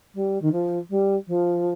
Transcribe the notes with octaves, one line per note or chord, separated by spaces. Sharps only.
G3
D#3
F3
G3
F3